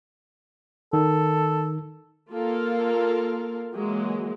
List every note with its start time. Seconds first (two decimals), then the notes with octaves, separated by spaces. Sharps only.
0.93 D#3 A4
2.31 A#3 F4 A4 A#4 F5
3.73 E3 F#3 G#3 A#3